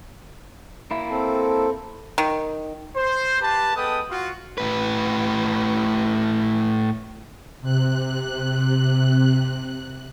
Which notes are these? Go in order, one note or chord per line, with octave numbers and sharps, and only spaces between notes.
A#3 E4
C4 A4
D#3
C5
G4 B4 A5
G#3 B3 A4 B4 G5 D#6
F4 F#4
A2 B4
C3 F#6